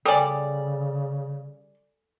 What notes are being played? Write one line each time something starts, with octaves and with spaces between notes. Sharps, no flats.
C#3 G3 A4 D5 G#5